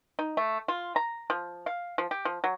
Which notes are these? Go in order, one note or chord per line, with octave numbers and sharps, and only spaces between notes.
D#4
A3
F4
A#5
F3
F5
F3
G4
F3
F#3